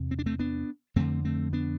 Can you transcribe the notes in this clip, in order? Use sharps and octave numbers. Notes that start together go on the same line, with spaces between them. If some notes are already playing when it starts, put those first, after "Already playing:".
Already playing: E2 C3
C4
D4
A3 C4
B3 D4
F2 D3 A3 C4
A3 C4
B3 D4